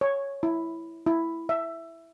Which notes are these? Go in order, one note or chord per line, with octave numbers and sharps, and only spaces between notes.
C#5
E4
E4
E5